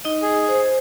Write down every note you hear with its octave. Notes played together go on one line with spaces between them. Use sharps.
D#4 D#5
G#4
C5